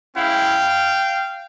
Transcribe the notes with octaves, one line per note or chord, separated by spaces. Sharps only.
G#3 C#4 E4 F5 G5